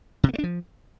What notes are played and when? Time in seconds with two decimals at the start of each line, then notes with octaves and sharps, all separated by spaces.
0.23 C3
0.28 B3
0.33 A3
0.38 D4
0.44 F3